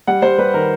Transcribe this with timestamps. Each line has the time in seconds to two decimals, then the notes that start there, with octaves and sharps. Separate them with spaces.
0.07 G3 F#5
0.22 G3 C5
0.38 G3 B4
0.54 D#3 A#4